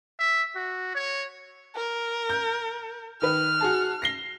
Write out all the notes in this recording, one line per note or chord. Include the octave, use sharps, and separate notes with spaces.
E5
F#4
C#5
A#4
G6
D#3 B4 F6
F#4 G#4 A5
A#6 C7 G7